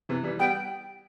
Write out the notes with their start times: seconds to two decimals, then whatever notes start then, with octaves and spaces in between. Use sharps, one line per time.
0.09 C3 E3
0.24 E3 G3
0.39 G3 B3 G5